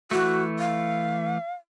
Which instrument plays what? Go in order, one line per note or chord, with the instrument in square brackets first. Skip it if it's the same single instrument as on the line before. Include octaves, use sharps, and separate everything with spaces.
[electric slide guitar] E3 A3 [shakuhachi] F#4
[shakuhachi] F5